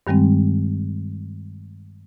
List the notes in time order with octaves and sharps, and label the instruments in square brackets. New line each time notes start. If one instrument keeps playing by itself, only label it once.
[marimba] G2 D#3 G3 G#3 C4